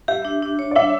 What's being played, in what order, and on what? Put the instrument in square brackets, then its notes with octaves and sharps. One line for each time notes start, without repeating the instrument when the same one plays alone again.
[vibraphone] G4 [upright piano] E5
[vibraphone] D4
D4
C#5
[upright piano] D5
[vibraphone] D4 [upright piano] E5